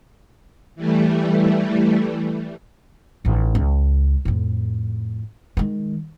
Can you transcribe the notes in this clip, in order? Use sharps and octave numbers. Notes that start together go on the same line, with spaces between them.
E3 G3 A3
A1 D#3
C#2
F2 A2
D#3 G#3